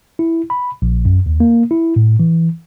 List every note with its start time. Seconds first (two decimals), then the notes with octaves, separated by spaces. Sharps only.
0.19 E4
0.50 B5
0.82 A#1
1.05 F#2
1.26 D#2
1.40 A#3
1.71 E4
1.96 A2
2.20 E3